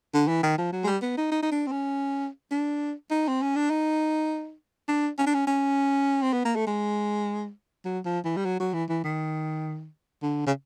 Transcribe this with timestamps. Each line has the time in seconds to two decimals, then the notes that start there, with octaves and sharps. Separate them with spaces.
0.14 D3
0.28 E3
0.43 D#3
0.58 F3
0.73 F#3
0.84 G#3
0.87 G3
1.02 B3
1.17 D#4
1.32 D#4
1.43 D#4
1.52 D4
1.67 C4
1.72 C#4
2.51 D4
3.11 D#4
3.28 C4
3.42 C#4
3.56 D4
3.70 D#4
4.88 D4
5.18 C#4
5.26 D4
5.34 C#4
5.47 C#4
6.22 C4
6.33 B3
6.45 A#3
6.56 A3
6.67 G#3
7.85 F#3
8.05 F3
8.25 E3
8.37 G3
8.45 F#3
8.60 F#3
8.74 E3
8.89 E3
9.04 D#3
10.22 D3
10.47 C#3